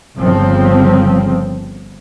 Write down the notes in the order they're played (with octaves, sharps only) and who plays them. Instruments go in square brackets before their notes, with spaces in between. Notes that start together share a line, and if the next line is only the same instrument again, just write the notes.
[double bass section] G1 C#3 F3 C4